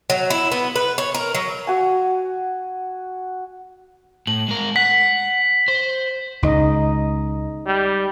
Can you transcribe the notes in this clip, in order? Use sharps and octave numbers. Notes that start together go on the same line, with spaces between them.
F#3
E4
B3
B4
C#5
A#4
F#3
F#4 G#5
A2 F#7
G#3 A#4
F#5 B6
C5
C#2 G#3 D#4 D#5
G3